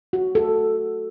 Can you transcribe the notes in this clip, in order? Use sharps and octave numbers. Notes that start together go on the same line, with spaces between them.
F#4
A4